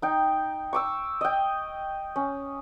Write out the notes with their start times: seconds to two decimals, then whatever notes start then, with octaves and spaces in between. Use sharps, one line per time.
0.02 D#4 G5
0.73 C#6 D6 E6
1.21 D#5 G5
2.16 C#4